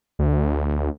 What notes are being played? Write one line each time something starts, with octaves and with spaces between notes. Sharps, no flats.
D2